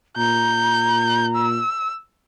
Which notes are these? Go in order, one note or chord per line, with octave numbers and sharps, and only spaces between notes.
A#2 A#5 G6
E6